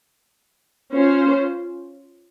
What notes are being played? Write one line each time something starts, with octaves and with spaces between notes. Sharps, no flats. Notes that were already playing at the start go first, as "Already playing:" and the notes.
C#4 F4 C5